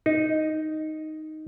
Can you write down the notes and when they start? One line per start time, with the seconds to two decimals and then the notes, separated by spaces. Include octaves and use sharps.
0.06 D#4